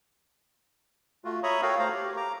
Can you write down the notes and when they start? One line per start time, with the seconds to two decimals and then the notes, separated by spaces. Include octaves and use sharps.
1.25 A3 F4 F#4
1.43 C#5 E5 A#5 B5 C#6 D#6
1.62 F#4 A4 A#4 C#5 F5 G5
1.79 A3 C5 F5 A#5
1.93 G4
2.17 A#5 D6